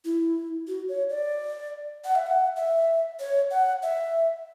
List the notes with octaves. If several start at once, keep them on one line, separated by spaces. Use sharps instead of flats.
E4
F#4
C#5
D5
F#5
E5
F#5
E5
C#5
F#5
E5